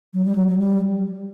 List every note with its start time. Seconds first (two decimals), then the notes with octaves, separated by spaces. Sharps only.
0.14 F#3
0.25 G3
0.35 F#3
0.47 F#3
0.59 G3